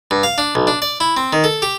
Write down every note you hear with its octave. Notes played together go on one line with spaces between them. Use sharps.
G2
F5
D4
B1
D4
D5
E4
C4
D#3
A4
G4